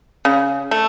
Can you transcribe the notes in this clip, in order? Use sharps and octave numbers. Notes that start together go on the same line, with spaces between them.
C#3
A3